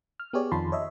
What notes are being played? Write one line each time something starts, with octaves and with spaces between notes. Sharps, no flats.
F6
B3 G4 G#4 C#5 D5
F2 D#3 F4 A5 B5 C6
C#5 D#5 E5